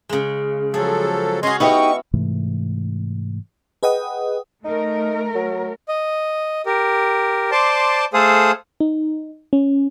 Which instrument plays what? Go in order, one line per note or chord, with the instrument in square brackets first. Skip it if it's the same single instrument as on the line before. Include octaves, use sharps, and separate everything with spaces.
[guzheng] C#3 G#3
[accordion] F3 F#3 A4 [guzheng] G#4
[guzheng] C#4 F#4 [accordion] D#5 G#5 C6
[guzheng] B3 E4 [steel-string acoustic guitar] D#4 G4 D#5 [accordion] C#6
[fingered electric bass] G#2 C3 E3 A3
[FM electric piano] G#4 B4 D#5 F#5 G5 D#6
[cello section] A3 A#4 [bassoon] D#4
[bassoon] F#3
[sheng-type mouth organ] D#5
G4 A#4
C5 D5 A5 C6 D6
A3 G#4 A4 C5 F5 D#6
[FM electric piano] D#4
C#4